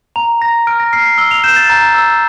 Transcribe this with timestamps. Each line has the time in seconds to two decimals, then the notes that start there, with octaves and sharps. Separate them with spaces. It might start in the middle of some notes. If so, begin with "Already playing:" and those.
0.16 A#5 F7
0.41 A#5 A#6
0.67 F6 D7
0.80 A#6
0.93 F6 C7
1.06 C7
1.18 E6 G7
1.31 F7
1.44 G6 E7
1.56 A6
1.70 A#5
1.95 E6